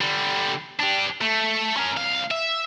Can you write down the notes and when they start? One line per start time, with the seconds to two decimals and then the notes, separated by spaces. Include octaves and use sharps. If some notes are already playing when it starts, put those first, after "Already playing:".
0.01 D3 G3
0.80 D4 G4
1.21 A3
1.77 C#4 A#4
1.97 C2 F5
2.31 E5